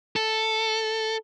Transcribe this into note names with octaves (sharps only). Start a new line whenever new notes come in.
A4